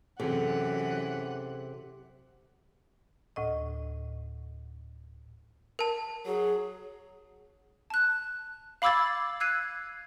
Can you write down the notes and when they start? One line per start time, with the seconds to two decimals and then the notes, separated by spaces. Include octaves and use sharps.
0.20 F#2 C3 E3 G#4 A4 F#5
3.36 D2 A2 D#5
5.79 A#4 A5
6.26 F#3 G#4
7.90 A5 F#6
8.82 F5 B5 D6 E6 G#6 A6
9.40 E6 F#6 G#6 C7 D#7